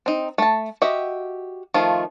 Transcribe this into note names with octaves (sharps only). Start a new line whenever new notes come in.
C4 D#4
A3 A5
F#4 G4 D#5 E5
D#3 F3 A3 F4